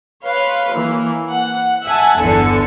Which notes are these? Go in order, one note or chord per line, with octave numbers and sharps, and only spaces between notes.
B4 C#5 F5 C6
E3 A#3
F#5
E5 F#5 G#5 A5
G1 E2 D3 A4 C#7